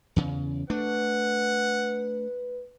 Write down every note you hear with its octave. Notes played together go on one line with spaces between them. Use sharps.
E2 C#3
A3 D4 B4 F#5